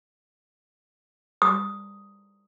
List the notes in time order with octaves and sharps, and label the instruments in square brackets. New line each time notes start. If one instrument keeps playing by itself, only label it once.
[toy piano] D#6